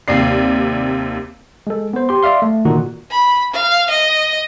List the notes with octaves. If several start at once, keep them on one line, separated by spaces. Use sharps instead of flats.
D#2 C3 D5 C7
G#3 A4
B3 C5
G4 C6
D5 E5 F5 C6
A3
A#2 D3 D#3 F#4
B5
F5
D#5